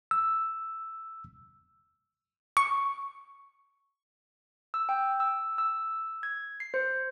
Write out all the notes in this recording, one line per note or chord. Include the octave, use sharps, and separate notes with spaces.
E6
C#6
E6
G5
E6
E6
G#6
C7
C5